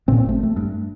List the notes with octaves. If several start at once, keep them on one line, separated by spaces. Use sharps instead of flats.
C#2 A#2 C4
G#1 A3
A3
G2